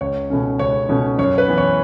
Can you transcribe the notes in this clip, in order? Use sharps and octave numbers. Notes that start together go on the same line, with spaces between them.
C#2 C#5
B2 A3 C#4
C#2 C#5
B2 A3 C#4
F#2 C#5
B4
E3 B3
C#5